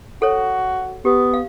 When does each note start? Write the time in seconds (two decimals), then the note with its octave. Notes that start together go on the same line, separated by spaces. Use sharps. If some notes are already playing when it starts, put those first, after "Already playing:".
0.22 F#4 A4 C#5
1.05 B3 G4
1.34 F5